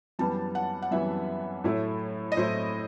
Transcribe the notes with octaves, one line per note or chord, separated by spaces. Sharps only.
F#2 E3 G3 B3 A5
F#5
F#5
F#2 E3 G3 B3 E5
A2 F#3 A3 E4
D#5
A2 F#3 A3 E4 C5